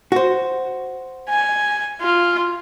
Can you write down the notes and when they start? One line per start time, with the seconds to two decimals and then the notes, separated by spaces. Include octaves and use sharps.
0.12 F#4 C5
1.29 G#5
2.01 F4